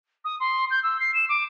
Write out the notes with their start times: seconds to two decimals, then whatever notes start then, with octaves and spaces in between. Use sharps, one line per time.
0.25 D#6
0.40 C6
0.71 G6
0.83 E6
1.00 C7
1.14 E7
1.29 D6